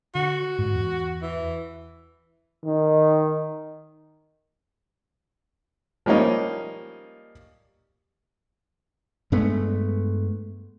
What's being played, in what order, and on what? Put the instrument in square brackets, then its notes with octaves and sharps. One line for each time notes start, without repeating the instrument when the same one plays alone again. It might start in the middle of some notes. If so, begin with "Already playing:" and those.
[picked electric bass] D3 [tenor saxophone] F#4
[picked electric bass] G#2
E2
[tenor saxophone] E3
[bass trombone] D#3
[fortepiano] F3 G3 A#3 C#4 D#4
[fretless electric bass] G2 G#3 A3 B3